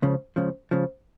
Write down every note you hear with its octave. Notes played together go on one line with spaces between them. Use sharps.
C#2 C#3 F3
C#2 C#3 F3
C#2 C#3 F3